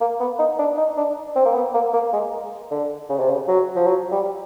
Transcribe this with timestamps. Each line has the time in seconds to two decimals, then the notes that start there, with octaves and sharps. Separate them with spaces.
0.01 A#3
0.20 B3
0.39 D#4
0.59 D4
0.78 D#4
0.97 D4
1.36 C4
1.45 A#3
1.55 B3
1.74 A#3
1.94 A#3
2.13 G#3
2.71 D3
3.10 C#3
3.20 C3
3.30 C#3
3.48 F#3
3.76 F3
3.86 F#3
4.12 G3